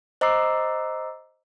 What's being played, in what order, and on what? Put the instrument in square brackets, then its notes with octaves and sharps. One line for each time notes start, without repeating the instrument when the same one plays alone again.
[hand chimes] C5 D#5 A#5 D6 E6 C7